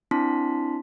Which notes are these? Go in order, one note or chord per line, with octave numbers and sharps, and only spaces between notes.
C4 D4 E4 A5 C6 B6